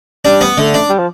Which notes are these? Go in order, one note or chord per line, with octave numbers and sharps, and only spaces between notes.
G3 D4
B3
D3 A3
D4
G3
F3